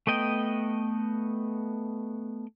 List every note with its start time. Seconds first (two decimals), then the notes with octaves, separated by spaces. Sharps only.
0.07 A3 B3 D#5 G5